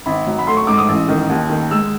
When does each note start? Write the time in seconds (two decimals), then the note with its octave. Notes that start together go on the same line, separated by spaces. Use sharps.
0.06 G#1 B5
0.26 F#3
0.39 B5
0.47 A3 C6
0.57 C#6
0.67 G#2 D6
0.78 D#6
0.89 A1
1.08 D#3
1.29 D#2
1.50 D#3
1.71 G#3 E6